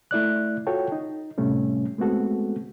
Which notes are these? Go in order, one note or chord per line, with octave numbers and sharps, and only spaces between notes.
A3 E4 D5 F#6
F4 F#4 A4 C#5 G5
D#4
A2 C3 G3 A3 C#4
G#3 A3 B3 C4 F#4 A4